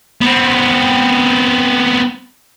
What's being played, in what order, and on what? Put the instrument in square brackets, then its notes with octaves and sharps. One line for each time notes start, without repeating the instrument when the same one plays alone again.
[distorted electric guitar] B3 C4